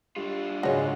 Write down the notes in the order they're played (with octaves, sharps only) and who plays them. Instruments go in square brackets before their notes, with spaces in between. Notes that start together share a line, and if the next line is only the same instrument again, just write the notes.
[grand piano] G3 [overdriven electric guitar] D4 F4
[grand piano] G#2 C#3 F#3 [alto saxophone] G#3 [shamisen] F#4 C#5